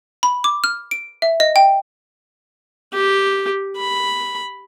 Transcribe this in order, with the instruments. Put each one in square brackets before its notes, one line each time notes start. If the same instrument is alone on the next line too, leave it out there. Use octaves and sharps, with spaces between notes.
[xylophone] B5
D6
F6
D7
E5
D#5
G5
[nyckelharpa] G4
B5